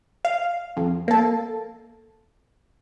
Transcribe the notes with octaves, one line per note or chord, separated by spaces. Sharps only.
F5
F2
A#3 A4